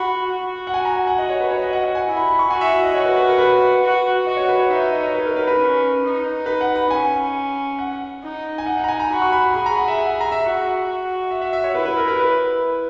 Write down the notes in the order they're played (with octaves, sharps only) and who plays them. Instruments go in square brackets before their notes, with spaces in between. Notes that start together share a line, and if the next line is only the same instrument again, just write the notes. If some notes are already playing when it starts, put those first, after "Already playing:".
Already playing: [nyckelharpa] F#4 [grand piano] B5
[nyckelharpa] F#4
[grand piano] F#5
G#5
A#5
G#5
F#5
[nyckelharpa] F#4 [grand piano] D#5
[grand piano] C#5
B4
C#5
D#5
F#5
F#5
G#5
[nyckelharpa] E4
[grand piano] B5
B5
C#6
[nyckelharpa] F#4 [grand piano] G#5
[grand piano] E5
D#5
[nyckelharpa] F#4 [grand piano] C#5
[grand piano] B4
B4
A#4
B4
[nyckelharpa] F#4
[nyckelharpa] F#4 [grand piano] D#5
[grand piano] C#5
B4
C#5
[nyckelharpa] D#4 [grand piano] E5
[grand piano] E5
D#5
C#5
B4
A#4
B4
B4
[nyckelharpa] C#4
D#4
[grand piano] B4
F#5
B5
[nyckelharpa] C#4 [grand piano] G#5
[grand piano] F#5
[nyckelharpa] D#4
[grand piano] G#5
[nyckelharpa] D#4 [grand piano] F#5
[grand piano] F#5
A#5
G#5
A#5
[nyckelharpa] F#4 [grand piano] B5
[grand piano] C#6
B5
B5
[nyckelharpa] G#4 [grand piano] B5
[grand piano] A#5
F#5
E5
F#5
A#5
E5
[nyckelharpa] F#4
F#4
[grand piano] E5
E5
E5
C#5
[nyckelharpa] E4 [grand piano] B4
[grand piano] B4
A#4
B4
B4